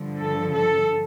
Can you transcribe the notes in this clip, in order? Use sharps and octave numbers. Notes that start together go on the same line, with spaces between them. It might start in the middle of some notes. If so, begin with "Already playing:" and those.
Already playing: G2 D3 F3
A4
A4